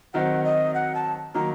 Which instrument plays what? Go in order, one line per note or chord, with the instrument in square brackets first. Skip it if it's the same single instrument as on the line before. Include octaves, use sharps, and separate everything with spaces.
[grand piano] D#3 F#3 C4 D#4 [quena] F#5
[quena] D#5
F#5
A5
[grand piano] D#3 F#3 A#3 D#4 [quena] A#5